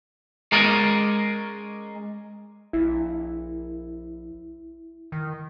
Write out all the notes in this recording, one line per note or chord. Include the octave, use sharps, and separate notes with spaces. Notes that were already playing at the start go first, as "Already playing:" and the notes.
G#3 C#4 A#4 D5 D#5
A#1 E4
D#3